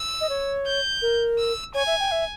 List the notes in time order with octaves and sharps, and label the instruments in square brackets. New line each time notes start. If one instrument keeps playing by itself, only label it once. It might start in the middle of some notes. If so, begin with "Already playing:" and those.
Already playing: [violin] E6
[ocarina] D#5
C#5
[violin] G6
[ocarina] A#4
[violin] E6
[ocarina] C#5 [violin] G#5
[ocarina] E5
G5
E5